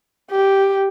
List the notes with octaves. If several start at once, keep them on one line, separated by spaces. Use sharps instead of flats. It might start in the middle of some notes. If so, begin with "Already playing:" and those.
G4